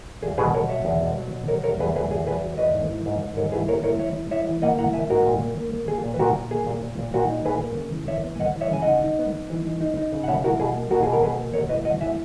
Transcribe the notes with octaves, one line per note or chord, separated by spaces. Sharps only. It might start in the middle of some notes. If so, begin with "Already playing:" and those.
E2 G#4
B2 G#4 B4
B2 A#4 C#5
F#3 C#5 E5
E2
B2
F#3
B2
B2 A#4 C#5
E2 A#4 C#5
E2 G#4 B4
E2 G#4 B4
E2 G#4
E2 G#4 B4
F#3
E2 B4 D#5
G#2
E4
G#2
G#2
G#2 A#4 C#5
E4 G#4 B4
A#3 A#4 C#5
E4 A#4 C#5
E3 C#5 E5
E4
E4 C#5 E5
E3
A#3 D#5 F#5
E4 F#5 A#5
A#3 E5 G#5
G#2 F#4 A#4
A#2
A#3
A#3
A#3
A#3 G#4
A#2
B4
A#2 F#4 A#4
A#2
A#3 G#4
A#2
A#2
A#2
A#2 F#4 A#4
D#4
A#2 G#4 B4
A#3
C#3
E3
E3 C#5 E5
B3
G#5
B3 D#5 F#5
E3
C#5 E5
C#3 G#5
D#4 D#5 F#5
D#4
B3
D#4
E3
D#4
D#4
D#4
C#3
F#5
B2 C#5 E5
E4 F#4 A#4
B2 G#4
A#3
B2 F#4 A#4
B2 G#4
A#4
B2 G#4 B4
A#3
B2 A#4 C#5
E4 B4 D#5
B2 D#5 F#5
E4 E5 G#5